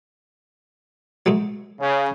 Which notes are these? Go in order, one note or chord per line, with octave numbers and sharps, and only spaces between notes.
F#3 G#3 A3
C#3